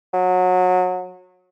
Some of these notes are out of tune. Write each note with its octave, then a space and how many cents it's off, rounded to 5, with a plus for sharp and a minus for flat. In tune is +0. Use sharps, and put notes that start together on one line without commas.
F#3 -25